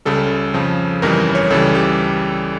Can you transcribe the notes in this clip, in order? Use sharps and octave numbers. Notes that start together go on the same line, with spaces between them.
C#2 C#3 G3 A4
F2 C#3 F3
G1 F2 C#3 E3 G3 A#4
C#5
C#2 C#3 E3 G3 A4
G4